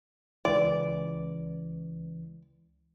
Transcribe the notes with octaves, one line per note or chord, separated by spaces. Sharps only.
C#2 E3 D5